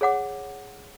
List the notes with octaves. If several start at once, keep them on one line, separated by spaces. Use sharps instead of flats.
G#4 C#5 F#5 D6